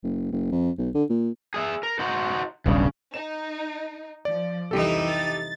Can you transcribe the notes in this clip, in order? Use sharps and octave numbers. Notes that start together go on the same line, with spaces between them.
F#1
F#1
F2
B1
D3
A#2
G#4 D#5 E5
A#4
D#4 F#4 C5
D#1 B1 G2 C#3
D#4 E7
F3 D5
C2 F2 E3 D#4 G4 A4
A6